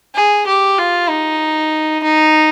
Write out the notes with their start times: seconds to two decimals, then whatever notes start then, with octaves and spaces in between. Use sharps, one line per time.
0.15 G#4
0.47 G4
0.78 F4
1.09 D#4
2.04 D#4